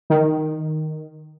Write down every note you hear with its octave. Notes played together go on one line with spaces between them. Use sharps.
D#3